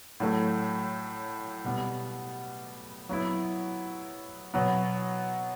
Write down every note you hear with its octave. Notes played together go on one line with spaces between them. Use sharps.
A2 F#3 A3
B2 G3 B3
F#3 B3 E4
B2 F#3 B3